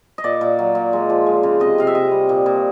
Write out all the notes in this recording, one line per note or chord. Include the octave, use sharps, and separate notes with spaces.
D#5
A#2 D5
A#2
F#3
A#2
G#3
F3
G#3
C#3
C3 D#5
C3 F5
E5
C3 D#5
G3
A#2
A#2